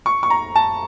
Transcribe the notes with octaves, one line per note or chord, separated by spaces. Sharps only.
C#6
C#6
A#5
A5